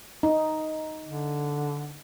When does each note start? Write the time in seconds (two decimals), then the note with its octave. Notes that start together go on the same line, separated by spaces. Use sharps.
0.23 D#4
1.04 D3